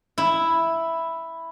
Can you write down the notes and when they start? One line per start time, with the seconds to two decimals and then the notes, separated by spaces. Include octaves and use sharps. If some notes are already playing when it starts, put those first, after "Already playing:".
0.18 E4